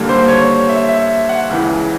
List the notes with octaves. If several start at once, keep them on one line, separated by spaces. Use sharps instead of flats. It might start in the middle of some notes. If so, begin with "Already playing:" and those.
Already playing: D#2 D3 G3 A#3
C5
C#5
E5
E5
F#5
C#2 C#3 E3